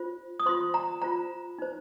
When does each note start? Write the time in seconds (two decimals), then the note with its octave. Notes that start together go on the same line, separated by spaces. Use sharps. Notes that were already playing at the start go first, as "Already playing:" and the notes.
Already playing: F4 C5
0.40 D#6
0.46 F4 C5 C6
0.74 A#5
1.02 F4 C5 A#5
1.58 D#4 C5